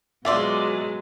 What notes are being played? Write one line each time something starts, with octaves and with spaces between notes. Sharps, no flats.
B2 F#3 G#3 F4 D5 E5 C6